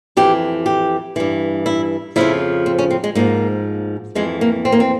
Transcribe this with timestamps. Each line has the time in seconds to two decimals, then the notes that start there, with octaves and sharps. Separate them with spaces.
0.17 F2 E3 G4
0.66 G4
1.16 G2 E3
1.66 E4
2.16 F2 C#3 F3 E4
2.66 C4
2.79 C#4
2.90 C4
3.04 G#3
3.15 G#2 F3 A#3
4.15 F2 E3 G#3
4.41 A#3
4.65 C4
4.72 A#3
4.80 C4